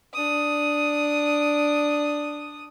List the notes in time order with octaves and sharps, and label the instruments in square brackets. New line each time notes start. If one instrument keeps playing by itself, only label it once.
[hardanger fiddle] D4 D#6